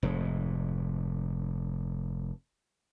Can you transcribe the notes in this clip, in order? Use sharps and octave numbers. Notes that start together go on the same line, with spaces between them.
F1 G#2